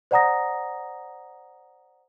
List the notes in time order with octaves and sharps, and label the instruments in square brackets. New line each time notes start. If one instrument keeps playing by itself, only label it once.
[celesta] C5 D5 F#5 A#5 D#6 A#6